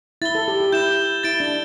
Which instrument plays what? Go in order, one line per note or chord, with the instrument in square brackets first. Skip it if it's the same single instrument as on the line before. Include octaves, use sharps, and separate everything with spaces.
[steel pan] E4 [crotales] A6 G7
[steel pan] A4
G4
G4
[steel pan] E4 [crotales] G6 E7 G7
[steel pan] E4 [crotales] A6 D7 G7
[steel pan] D4